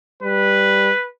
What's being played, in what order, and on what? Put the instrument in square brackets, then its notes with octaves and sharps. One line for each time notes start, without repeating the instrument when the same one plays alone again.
[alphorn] G3 [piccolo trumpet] B4